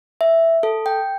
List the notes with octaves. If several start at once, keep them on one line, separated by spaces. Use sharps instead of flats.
E5
A4
G5